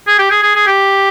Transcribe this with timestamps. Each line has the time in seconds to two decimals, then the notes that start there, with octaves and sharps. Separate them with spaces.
0.07 G#4
0.19 G4
0.31 G#4
0.43 G#4
0.55 G#4
0.67 G4